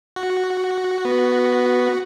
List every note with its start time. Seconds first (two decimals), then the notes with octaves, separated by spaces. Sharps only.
0.16 F#4
1.05 B3